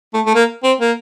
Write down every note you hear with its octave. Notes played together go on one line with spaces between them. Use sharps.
A3
A3
A#3
C4
A#3